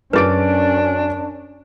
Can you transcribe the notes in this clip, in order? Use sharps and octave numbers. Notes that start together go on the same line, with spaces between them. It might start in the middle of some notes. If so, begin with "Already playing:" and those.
F#2 C#4 D4 G#4 B4 A6 D7